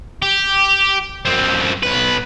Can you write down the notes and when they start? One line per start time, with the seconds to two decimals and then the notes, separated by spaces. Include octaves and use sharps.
0.22 G4
1.25 F#2 C4
1.83 B1 B4